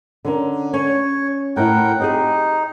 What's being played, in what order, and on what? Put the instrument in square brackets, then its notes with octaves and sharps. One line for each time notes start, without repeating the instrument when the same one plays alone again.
[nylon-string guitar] D3 C#4 A#4
[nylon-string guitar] C#4 [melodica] C#5
[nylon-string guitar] A2 E4 [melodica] A#4 F#5 G5
[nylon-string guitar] C4 G4 G#4 [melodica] D#4